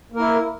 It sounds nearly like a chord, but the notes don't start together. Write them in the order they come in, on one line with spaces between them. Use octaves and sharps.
A#3 A#4 E4